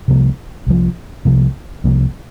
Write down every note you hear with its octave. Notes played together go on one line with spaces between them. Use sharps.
C2 C3 F3 A#3
C2 C3 F3 A#3
C2 C3 F3 A#3
C2 C3 F3 A#3